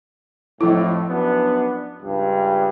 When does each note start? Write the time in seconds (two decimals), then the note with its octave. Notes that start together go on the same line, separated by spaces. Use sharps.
0.61 F2 A2 F3 E4
1.09 F#2 B3 D4
2.02 C#2 G2